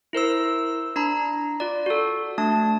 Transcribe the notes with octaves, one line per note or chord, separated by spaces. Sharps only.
E4 A#4 C5 E6
D4 A#5 B5
F4 D5
F#4 A4
A3 D4 A5